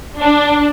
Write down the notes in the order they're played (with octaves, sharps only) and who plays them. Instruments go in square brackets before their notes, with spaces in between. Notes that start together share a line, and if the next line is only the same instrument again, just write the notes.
[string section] D4